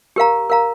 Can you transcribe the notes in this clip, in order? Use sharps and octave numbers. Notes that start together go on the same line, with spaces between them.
G4 A#4 F5 A#5
A#4 F5 A#5